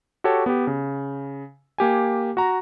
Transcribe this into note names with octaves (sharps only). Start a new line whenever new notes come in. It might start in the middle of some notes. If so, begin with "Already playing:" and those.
F#4 G4 A4 C#5
B3 G4
C#3
A#3 G4 G#5
F#4 A#5